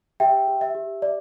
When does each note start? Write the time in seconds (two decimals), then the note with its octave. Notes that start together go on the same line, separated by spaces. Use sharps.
0.20 G4 E5 G5
0.48 G4
0.61 E5
0.75 G4
1.02 D5